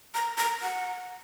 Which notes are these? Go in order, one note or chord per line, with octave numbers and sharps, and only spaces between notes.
A#5
A#5
F#5